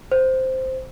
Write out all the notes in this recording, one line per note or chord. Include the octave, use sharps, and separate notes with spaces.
C5